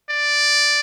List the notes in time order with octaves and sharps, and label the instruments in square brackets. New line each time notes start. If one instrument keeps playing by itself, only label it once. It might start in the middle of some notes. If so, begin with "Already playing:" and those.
[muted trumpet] D5